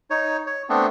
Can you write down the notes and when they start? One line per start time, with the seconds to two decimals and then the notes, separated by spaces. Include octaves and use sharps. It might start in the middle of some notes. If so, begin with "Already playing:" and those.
0.10 D#4 C#5
0.47 C#5
0.69 A3 B3 C4 D4